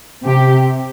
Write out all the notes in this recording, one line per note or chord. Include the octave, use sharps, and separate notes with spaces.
C3 G4